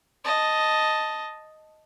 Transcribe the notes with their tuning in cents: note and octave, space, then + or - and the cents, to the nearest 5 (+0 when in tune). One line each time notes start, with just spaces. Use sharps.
D#5 +0 A5 +0